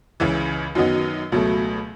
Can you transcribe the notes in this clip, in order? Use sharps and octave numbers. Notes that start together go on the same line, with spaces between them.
C#2 C#3 E3
F#2 D#3 F#3 B3 D#4
C#2 B2 F#3 A3